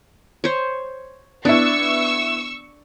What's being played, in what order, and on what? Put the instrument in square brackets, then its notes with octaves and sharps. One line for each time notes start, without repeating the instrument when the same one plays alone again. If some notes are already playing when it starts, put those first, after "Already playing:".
[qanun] C5 C#5
[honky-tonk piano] B3 E4 [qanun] D4 [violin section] C#6 E6